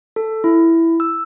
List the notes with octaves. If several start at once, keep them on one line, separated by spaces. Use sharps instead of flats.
A4
E4
E6